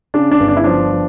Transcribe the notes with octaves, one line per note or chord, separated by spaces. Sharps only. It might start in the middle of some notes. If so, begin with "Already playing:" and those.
C#3 D4
D4
G1
D4
E4
F3 D4
F3